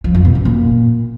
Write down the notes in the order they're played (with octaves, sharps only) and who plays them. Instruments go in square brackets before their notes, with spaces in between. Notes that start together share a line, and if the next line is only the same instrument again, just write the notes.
[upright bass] F3
F2
B2
F#2
A#2